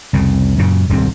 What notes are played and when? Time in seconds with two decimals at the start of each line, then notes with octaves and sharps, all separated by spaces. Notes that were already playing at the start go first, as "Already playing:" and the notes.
0.13 C2 F2 C#3
0.58 F#2 A#2 C#3
0.89 D#1 C2 G#2 C4